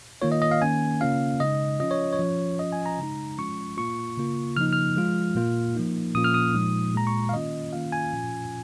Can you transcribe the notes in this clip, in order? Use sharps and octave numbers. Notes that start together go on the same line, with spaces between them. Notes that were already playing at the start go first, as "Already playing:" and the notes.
D#3 A#3 F4 C#5
D#5
D#5
F5
D#3 A#3 C#4 G#5
C#3 A#3 C#4 F4 F5
C#3 G#3 D#4 D#5
F3 C#4 F4 D#5
C#5
C#5
F3 C#4 F4
F3 C#4 F4 D#5
G#5
A#5
C#3 G#3 D#4
F3 G#3 C#4 F4 C#6
A#2 A#3 F4 C#6
C#3 A#3 F4
C#3 F3 A#3 D#4 F6
F6
F3 G#3 F4
A#2 A#3 F4
F3 A#3 D#4
A#2 F3 A#3 C#4 F4 D#6
F6
D#6
A#2 F3 G#3 D#4
A#2 G#3 F4 A#5
C#6
F5
D#3 A#3 C#4 F4 D#5
D#3 A#3 C#4 F4 F5
G#5
A#2 F3 C#4 F4